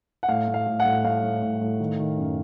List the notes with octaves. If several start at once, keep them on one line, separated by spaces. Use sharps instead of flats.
F#5
A2 F5
A2
F5
A2
F#5
A2
A2 F5
A2
A2
A2
D#3
D#3
F#2